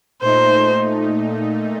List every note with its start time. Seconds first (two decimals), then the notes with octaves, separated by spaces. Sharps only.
0.22 A#2 A3 D#4 C5